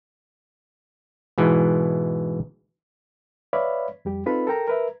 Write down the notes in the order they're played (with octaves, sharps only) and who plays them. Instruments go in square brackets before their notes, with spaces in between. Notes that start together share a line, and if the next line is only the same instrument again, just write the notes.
[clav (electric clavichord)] G#2 B2 E3
[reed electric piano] B4 C#5 D5 E5 F5 B5
F2 G3 G4
C4 D#4 F4 A4 B4 B5
A4 A#4 G5 A#5
A#4 B4 E5